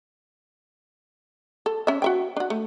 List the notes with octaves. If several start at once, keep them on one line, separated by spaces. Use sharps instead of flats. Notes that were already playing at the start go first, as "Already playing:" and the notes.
A4
C#4 E5
F#4 E5 G5
D4 F#4
A3